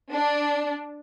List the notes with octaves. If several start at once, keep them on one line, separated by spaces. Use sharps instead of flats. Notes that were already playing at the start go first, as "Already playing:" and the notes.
D4